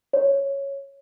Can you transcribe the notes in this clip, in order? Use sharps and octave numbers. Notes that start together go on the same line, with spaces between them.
C#5